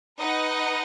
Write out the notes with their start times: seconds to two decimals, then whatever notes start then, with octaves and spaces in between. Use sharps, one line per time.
0.19 D#4 B4 D#5 F#5